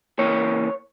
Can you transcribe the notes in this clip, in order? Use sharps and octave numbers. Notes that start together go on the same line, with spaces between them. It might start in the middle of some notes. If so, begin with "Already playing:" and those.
C#3 E3 A#3 C#5